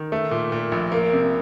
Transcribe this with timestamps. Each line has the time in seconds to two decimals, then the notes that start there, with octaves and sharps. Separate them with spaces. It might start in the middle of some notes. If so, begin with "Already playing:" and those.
Already playing: D#3
0.12 A3
0.31 A#2
0.52 A#2
0.72 A#1
0.92 A#3
1.13 C3